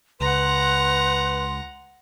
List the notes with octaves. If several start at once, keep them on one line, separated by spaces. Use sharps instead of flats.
C#2 B4 F#5 A#5 C6